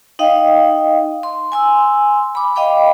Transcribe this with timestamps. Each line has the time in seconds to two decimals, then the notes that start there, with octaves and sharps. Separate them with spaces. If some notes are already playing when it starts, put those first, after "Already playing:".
0.19 D#4 D#5 F5 G5
1.23 C6
1.52 G#5 C6 E6
2.35 B5 D6
2.55 D#5 F5 G5 B5 D6